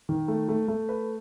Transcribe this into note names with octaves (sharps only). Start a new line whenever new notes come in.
D#3
A3
A3
A3
B4